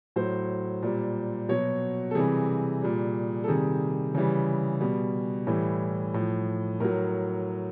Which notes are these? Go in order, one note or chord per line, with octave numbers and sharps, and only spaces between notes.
A2 F#3 C5
A#2 G3
B2 F#3 C#5
A4
C3 E3 G3 G#4
A#2 G3
A4
C3 D#3 G3 G#4
C#3 E3 G3
B2 G3
A2 E3 G3
A2 F3
A2 F#3 A#4